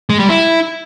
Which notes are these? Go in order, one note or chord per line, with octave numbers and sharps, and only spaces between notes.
G#3
G3
E4